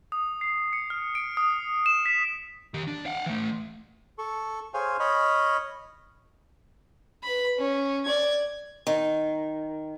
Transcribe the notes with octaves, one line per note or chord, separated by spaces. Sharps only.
D#6
C7
C#7
F6
D7
D#6
E7
B6
D#3 G4
D4
F5 F#5
E3 A3
A4 C#6
G#4 C5 C#5 F5 G#5 F6
C#5 D#5 B5 F6
B4 B5
C#4
D5 G#6
D#3